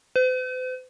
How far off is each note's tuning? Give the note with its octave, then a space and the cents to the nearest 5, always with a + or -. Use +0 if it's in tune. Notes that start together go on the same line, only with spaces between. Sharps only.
C5 -45